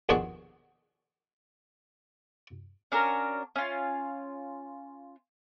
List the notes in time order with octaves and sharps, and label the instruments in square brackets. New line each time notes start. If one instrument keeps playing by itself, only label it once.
[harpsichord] A#1 D#2 B2 D4 F#4 G#4
[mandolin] C#4 D4 F#4 A#4
C#4 F4